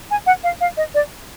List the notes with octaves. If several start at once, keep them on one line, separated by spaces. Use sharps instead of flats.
G#5
F#5
F5
F5
D#5
D5